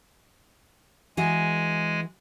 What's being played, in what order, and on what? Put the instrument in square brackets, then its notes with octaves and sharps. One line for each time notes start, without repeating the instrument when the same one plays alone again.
[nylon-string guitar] E3 F#4 G#4 [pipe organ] G#3 G#5